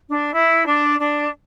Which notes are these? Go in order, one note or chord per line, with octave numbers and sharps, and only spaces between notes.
D4
E4
D4
D4